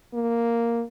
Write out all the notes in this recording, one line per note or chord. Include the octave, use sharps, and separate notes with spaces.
A#3